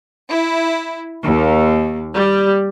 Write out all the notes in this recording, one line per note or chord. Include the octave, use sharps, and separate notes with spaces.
E4
D#2
G3